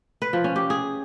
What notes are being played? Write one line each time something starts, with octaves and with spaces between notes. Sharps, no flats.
B4
F3
C#4
G4
G#4